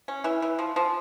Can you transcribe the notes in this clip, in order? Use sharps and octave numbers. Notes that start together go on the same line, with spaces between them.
C#4
E3
E3
F3
F3